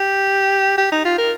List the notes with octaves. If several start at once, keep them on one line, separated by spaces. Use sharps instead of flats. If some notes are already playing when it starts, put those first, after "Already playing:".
Already playing: G4
G4
D#4
F4
A#4